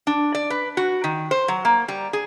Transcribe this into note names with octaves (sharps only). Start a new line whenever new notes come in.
D4
D5
B4
F#4
D#3
C5
F#3
A#3
G3
G#4